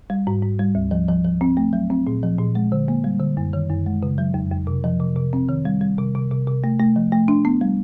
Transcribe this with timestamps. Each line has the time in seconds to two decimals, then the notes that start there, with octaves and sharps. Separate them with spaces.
0.10 G3
0.27 G#2
0.42 G#2
0.59 G3
0.75 D2
0.91 F3
1.08 F3
1.25 F3
1.41 C4
1.57 A3
1.73 F#3
1.90 C4
2.07 A#2
2.23 F3
2.38 A#2
2.55 G#3
2.72 D3
2.88 A#3
3.04 G3
3.20 D3
3.37 F#2
3.53 D#3
3.69 F#2
3.86 G#3
4.03 C#3
4.18 F#3
4.34 F2
4.51 F2
4.67 C3
4.84 F3
5.00 C3
5.16 C3
5.33 C4
5.49 D#3
5.65 G3
5.81 G3
5.98 C3
6.15 C3
6.31 C3
6.47 C3
6.64 A3
6.79 A3
6.96 F3
7.12 A3
7.28 D4
7.45 B3
7.61 G3